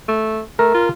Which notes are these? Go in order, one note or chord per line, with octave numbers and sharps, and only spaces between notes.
A3
A3 A#4
F4